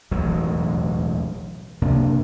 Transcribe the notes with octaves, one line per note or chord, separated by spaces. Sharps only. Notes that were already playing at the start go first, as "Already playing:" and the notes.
E1 A1 D#2 F#3
F#2 C3 A#3 D4